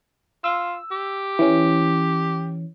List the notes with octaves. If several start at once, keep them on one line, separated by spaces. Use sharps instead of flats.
F4 E6
G4
E3 C#4